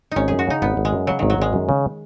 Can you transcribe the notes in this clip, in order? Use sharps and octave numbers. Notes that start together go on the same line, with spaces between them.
G#1 C#4 D#4
F#2 G#4
F#4
C#3 D#4
G#1 B3
G#1
G#3
F#2
C#3 F#3
G#1 D#3
F#3
G#1 G#3
F#2
C#3